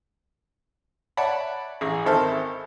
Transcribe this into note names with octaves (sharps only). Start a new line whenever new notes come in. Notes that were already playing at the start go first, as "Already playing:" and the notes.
C#5 D5 E5 F#5 A5 B5
A1 G#4
G#1 D#3 A4 C5 E5 F6